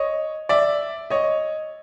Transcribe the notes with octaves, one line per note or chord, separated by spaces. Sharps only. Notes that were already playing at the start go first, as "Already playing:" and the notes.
Already playing: C#5 D#5
D5 E5
C#5 D#5